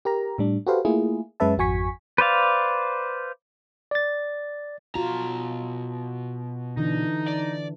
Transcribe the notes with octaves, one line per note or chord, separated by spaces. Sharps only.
G4 A#4 A#5
A2 G3 D4
F#4 G4 A4 B4 C5 F5
A3 A#3 E4 F4 G#4
F#2 G#3 C#4 B4 E5 A5
G#1 F2 F#4 G#5 C#6 B6
B4 C5 D5 F5
D5 A6
B2 F4 F#4 A#5
D3 E3 D4 D#4
D5